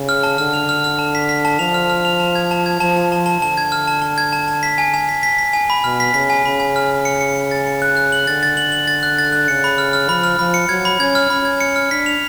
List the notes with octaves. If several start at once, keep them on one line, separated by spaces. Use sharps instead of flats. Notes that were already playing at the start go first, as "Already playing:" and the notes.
Already playing: C#3
F6
A5
D3 F6
F7
F6
F6
A5
B6
B6
A5
F3 F7
F6
F6
F7
A5
G#6
A5
G#6
F3 A5
A5
A5
A5
D3 A5
G#6
F6
A5
A5
G#6
A5
A5
B6
G#5
G#5
B6
B6
B6
G#5
B5
B2 F6
B6
C#3 B6
G#5
C#3 B5
G#5
F6
F6
C#7
C#7
C#7
A6
C#7
F#6
F#6
F#7
D3 A6
A6
F#7
F#7
A6
F#6
A6
F#6
C#3 C#7
B5
F6
F6
F3 B5
F6
F3 B5
C#7
F#3 G#6
B5
C#4 G#6
F6
C#4 B5
G#6
C#7
F6
D4 B6
F7